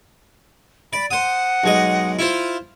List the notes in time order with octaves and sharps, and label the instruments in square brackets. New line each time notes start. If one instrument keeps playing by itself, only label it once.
[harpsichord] D5 [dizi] B5
[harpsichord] C5 D#6 [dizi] F#5
[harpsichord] B1 G#3 D#5
E4 F4 C5